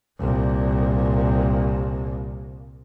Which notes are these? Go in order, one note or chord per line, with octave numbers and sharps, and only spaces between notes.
C2 A#2